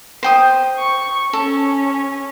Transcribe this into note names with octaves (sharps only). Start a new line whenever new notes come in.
C5 G5 D#6
C#6
C#4 A4